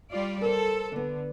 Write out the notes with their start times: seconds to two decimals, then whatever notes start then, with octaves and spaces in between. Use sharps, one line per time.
0.10 G3 F4 D5
0.41 A4 A#4 C5
0.92 D3 B3 D4